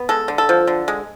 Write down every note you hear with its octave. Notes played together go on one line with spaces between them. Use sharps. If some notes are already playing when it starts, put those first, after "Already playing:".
Already playing: B3
G#3 A4
D3
A4
F3
D3
G#3